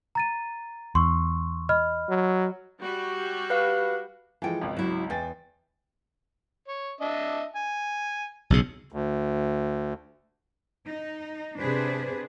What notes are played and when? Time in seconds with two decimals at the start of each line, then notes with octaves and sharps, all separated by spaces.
0.15 A#5 A6 D#7
0.95 E2 C6 C#6 E6
1.69 D#5 B5 F6
2.09 F#3
2.82 G3 F#4 G4
3.50 B4 F5
4.42 E3 F3 G#3 A4 G5
4.61 G#1 C#2
4.77 F#3 E4 F#4
5.10 E2 G5 G#5 A6
6.68 C#5
7.01 D4 D#5 E5
7.55 G#5
8.50 B1 C#3
8.92 D2
10.87 D#4
11.59 C3 D4 G#4 B4 C5